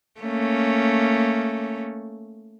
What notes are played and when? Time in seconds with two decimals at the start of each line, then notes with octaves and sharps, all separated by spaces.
0.21 A3 A#3 C#4